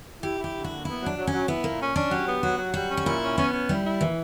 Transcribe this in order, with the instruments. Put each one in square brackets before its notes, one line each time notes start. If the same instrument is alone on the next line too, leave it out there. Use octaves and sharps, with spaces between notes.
[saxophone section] E4 [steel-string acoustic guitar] G4
[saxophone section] E4
[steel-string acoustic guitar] G4
[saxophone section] D3
[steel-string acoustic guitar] F#4
[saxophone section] A#3
[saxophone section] B3 [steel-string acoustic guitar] E4
[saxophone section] F#3 [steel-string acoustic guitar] D4
[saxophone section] F#3
[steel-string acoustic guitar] C#4
[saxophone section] F#3
[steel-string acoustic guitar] B3 [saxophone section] E4
[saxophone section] A#2 [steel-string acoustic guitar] A#3
[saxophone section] C#4
[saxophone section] C#4 [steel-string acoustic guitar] D4
[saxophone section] F#3 [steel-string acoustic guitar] G4
[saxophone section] B3
[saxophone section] F#3 [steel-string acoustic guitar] F#4
[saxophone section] F#3
[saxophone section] G3 [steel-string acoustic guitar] F#4
[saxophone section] C#4
[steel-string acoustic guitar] F#4
[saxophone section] A#2 [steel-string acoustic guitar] E4
[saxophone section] C#4
[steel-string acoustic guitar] B3 [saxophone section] C#4
[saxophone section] C#4
[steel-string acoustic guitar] G3 [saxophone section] E4
[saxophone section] E4
[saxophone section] A#2 [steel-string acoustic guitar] E3